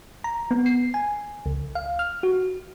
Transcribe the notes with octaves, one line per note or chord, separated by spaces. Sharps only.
A#5
B3
C7
G#5
C#2
F5
F6
F#4